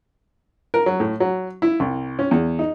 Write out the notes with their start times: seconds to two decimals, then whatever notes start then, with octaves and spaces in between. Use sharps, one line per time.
0.74 A#4
0.86 F#3
1.00 A2
1.20 F#3
1.62 E4
1.80 C2
2.19 C#4
2.31 E2
2.59 D#4